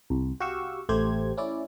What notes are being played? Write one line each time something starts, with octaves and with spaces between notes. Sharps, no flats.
C2
F#4 G4 F5 C#6 E6
A1 A3 G4 C5 G#6
C#4 E4 D5